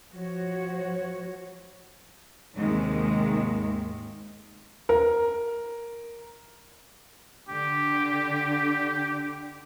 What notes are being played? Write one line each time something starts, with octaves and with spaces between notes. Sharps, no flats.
F3 F#4 C#5
D#2 G#2 C3 D#3 G#3
A#4
D3 G4